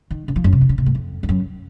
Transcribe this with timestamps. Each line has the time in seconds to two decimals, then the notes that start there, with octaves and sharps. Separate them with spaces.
0.11 D#3
0.28 C#3
0.36 F3
0.44 F#2
0.53 C3
0.61 D#3
0.69 C#3
0.78 C3
0.86 G#2
0.95 F2
1.23 F2
1.29 F#2